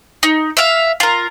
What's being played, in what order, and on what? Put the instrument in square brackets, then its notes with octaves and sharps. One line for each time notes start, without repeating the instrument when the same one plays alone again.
[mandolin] D#4
E5 F5
F4 A#4